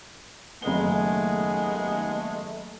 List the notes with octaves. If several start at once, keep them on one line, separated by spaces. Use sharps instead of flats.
F#1 D#2 C#3 G#3 A3 B3 G#5 G7